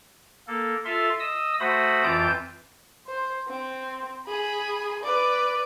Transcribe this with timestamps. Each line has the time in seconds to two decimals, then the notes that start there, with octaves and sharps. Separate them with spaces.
0.48 A#3 A4
0.85 F4 A4 E5 F5 C6
1.19 D#5 D#6 E6
1.60 A3 F#4 C5 B5 D#6
2.04 F2 E3 F4 G5 A5 G6
3.07 C5
3.48 C4
4.27 G#4 B5
5.03 B4 D5